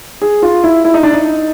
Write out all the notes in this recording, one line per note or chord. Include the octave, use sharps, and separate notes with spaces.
G#4
F4
E4
E4
D#4
D4
D#4